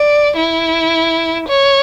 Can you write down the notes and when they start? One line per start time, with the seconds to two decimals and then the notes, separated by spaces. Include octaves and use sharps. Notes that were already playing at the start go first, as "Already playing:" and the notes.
Already playing: D5
0.37 E4
1.49 C#5